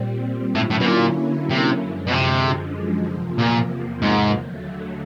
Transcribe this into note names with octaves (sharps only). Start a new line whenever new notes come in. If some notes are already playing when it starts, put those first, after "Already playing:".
Already playing: A#2 G3 C4
A2 D3 F#3 A#3 C#4 E4
A2
B2
A#2
C3
F#2 D3 F3 G#3
B2
C3
E2 C3 F3 A#3
A#2
G#2
D#2 D3 F#3 A3